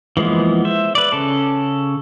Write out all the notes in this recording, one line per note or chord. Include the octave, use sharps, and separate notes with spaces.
E3 F3 G#3 A#3 B3
C5 E5
B4 D5
C#3 A4